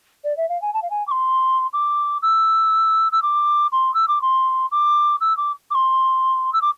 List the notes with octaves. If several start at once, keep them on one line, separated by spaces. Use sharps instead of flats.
D5
E5
F5
G#5
A5
F5
G#5
D6
C6
D6
E6
E6
D6
C6
E6
D6
C6
D6
E6
D6
D6
C6
E6
D6